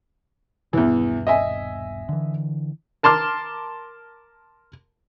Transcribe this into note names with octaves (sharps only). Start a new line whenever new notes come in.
D#1 E2 G2 B2 E3
D#5 E5 G#5
D3 E3
A#4 A5 C6 D6 F6